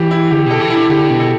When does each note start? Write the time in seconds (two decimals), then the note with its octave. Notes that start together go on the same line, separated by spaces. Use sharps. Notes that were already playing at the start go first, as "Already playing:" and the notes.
Already playing: E3 E4 G4
0.11 E4
0.31 D3 G4
0.46 B2 A4
0.60 E3
0.70 E4
0.75 D3
0.90 D3 G4
1.10 B2
1.20 A4